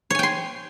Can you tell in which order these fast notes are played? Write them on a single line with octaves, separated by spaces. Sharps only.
C#5 G#5 G5 C6